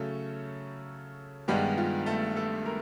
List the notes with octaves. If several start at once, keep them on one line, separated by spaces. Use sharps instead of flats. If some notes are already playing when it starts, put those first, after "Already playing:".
Already playing: C#3 F#3 A3 C#4 A4
G2 D#3 G3 G#3 B3 D4 G4
F4
A3 A4
A3 A4
A#3 A#4